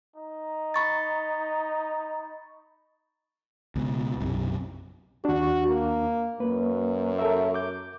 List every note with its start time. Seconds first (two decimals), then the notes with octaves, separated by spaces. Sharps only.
0.16 D#4
0.74 B5 C#6 A6
3.75 C#2 B2
4.21 B1 F#2 C3
5.25 D#2 D4 F#4
5.67 A#3
6.40 F#2 A#3 B4
7.19 A4 A#4 E5
7.54 D6 G6